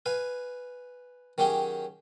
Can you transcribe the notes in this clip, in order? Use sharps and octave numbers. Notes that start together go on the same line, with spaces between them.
B4 F5 G#5
D#3 F#3 C#4 G4 G#4 G5